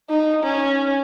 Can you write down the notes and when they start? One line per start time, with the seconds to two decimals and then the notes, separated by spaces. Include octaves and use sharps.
0.09 D#4
0.44 C#4